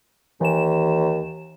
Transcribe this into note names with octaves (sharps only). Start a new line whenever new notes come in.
D#2 E3 E7